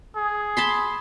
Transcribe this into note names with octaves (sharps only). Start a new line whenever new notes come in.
G#4
A5 B5 C6